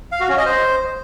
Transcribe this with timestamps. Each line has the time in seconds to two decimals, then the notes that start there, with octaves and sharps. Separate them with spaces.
0.12 F5
0.21 F#4
0.29 C#4
0.37 D#5
0.46 C5